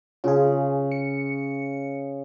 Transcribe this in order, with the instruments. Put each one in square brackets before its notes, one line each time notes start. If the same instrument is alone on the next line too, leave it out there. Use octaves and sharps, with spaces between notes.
[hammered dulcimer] C#3 [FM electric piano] F4 G#4
[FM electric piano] C#7